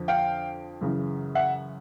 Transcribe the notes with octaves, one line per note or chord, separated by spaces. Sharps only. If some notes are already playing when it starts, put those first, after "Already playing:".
Already playing: F2 D3 F3
F5 G5
F#2 C#3 E3
E5 F#5